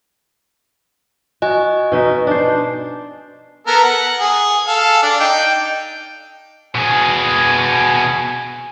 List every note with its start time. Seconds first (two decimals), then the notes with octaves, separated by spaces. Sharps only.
1.42 F#4 D#5 G#5
1.92 B2 D#4 E5
2.27 D4 C5
3.67 B3 A4 A#4
3.84 F#5
4.20 G#4
4.67 A4 F5
5.03 D4 D5
5.20 D#4 G5
6.75 B2 G#4 G#5